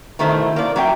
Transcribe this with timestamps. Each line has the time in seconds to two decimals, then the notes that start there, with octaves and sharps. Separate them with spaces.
0.19 B2 D#3 A3 E4 C5
0.56 A#3 D5
0.76 F#3 E4 G5